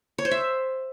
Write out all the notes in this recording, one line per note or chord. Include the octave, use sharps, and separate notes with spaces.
C#5
C5
E5